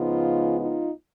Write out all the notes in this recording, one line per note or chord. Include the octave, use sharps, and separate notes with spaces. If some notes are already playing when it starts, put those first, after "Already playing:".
Already playing: C#2 C#3 F3 G#3 B3 D#4 F4
D#4 F4